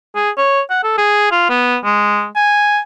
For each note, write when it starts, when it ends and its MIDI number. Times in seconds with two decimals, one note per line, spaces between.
0.16 0.30 68
0.38 0.61 73
0.70 0.83 78
0.84 0.97 69
0.98 1.30 68
1.31 1.49 65
1.49 1.77 59
1.84 2.27 56
2.36 2.80 80